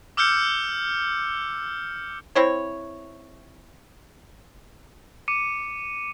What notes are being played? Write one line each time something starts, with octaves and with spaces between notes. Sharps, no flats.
D6 E6 F6 G6 C#7
C4 E4 C#5
D6 C#7 D#7